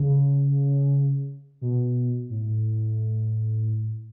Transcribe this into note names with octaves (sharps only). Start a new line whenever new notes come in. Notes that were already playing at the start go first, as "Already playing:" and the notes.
Already playing: C#3
B2
A2